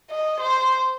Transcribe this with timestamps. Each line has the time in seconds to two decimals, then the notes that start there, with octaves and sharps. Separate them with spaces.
0.10 D#5
0.40 C5